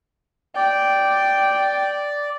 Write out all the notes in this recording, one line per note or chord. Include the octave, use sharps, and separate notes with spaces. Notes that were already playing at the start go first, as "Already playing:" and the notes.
D5 G5